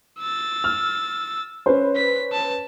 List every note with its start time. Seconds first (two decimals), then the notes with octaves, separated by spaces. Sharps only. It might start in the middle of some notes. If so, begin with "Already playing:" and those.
0.19 E6 A6
0.64 F6
1.66 C#4 B4 C5
1.96 B6
2.32 A5